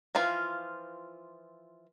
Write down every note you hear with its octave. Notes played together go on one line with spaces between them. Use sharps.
E3 F3 F4